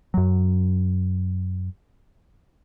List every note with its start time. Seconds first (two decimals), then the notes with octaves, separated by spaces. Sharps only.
0.14 F#2 F#3